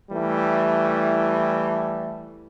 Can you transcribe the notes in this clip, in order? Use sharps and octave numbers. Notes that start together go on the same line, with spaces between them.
E3 G3 A3